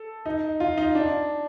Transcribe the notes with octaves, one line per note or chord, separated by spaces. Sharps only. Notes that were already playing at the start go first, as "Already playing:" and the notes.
Already playing: A4
D#4
F4
D#4
D4